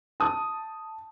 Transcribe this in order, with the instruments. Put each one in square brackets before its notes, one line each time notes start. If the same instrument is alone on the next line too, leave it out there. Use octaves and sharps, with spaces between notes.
[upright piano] A5 D#6